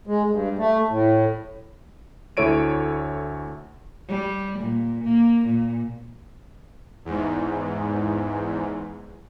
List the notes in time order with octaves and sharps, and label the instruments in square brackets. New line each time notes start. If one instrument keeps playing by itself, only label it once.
[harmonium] G#3
G2
A3
A2
[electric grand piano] D2 E4 A4 C#5 D7 D#7
[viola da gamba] G3
A#2
A#3
A#2
[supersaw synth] E2 G#2